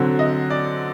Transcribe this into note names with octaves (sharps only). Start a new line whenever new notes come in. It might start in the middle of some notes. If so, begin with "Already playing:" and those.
Already playing: D3 F#3 C4
D#5
D5